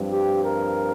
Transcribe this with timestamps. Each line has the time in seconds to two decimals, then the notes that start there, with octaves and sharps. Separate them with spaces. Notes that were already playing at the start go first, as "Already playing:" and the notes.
Already playing: G2 F3 C4
0.12 G4
0.44 A#4